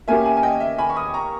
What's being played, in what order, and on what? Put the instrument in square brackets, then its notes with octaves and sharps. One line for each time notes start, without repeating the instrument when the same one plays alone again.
[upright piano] A#3 C#4 G4 [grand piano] E5 G#5
[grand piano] E5 G#5
G#5
D#5 G5
E5
G#5 B5
C#6
B5 D#6
A#5 C#6